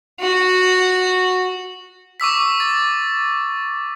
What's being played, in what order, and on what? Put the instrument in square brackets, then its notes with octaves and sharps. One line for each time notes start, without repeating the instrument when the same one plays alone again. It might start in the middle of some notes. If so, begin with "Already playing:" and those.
[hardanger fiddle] F#4
[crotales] C#6 D6 E6 B6
A6